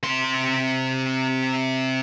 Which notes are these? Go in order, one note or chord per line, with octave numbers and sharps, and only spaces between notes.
C3 C6